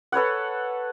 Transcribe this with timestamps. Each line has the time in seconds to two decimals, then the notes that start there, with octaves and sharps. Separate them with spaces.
0.12 A4 B4 C#5 F#5